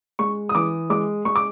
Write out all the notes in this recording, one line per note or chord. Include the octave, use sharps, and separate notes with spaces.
G#3 C#6
D#6
E3 D6
G#3 D6
G#3 C#6
D6